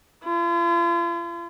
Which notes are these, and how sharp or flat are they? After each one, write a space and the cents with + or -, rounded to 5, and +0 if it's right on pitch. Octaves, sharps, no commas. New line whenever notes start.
F4 -45